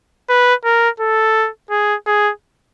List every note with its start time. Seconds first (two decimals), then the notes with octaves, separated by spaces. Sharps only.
0.29 B4
0.65 A#4
1.00 A4
1.71 G#4
2.06 G#4